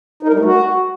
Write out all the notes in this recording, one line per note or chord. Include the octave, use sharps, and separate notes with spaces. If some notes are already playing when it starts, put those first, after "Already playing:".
D#4
A#4
G3
A3
F#4